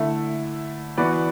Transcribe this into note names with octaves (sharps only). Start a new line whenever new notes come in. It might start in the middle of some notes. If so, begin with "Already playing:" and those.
Already playing: D3 A3 E4 A4 E5
E3 B3 F#4 B4 D5